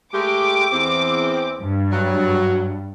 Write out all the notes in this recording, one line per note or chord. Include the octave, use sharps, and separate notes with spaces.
G#3 A3 G4 D6
E2 C4
G2
F#3